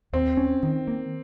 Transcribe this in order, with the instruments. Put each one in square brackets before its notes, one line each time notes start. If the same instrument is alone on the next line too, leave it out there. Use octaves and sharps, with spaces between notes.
[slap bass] D#2 [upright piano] C4
[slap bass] C#4
D#3
A#3